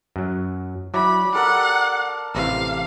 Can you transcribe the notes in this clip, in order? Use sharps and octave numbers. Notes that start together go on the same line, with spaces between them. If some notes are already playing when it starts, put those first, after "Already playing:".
F#2 F#3
F#3 E4 F#4 D5 B5
G4 A4 A#4 F#5
A1 C3 E3 F5